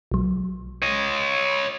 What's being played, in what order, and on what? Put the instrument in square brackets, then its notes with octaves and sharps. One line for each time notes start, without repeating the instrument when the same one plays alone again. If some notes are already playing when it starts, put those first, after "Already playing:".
[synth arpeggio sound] B1 F#3
[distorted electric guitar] C#5 D#5